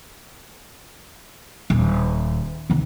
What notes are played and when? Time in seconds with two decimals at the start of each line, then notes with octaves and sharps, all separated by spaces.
1.70 D#1
2.70 D#2 C3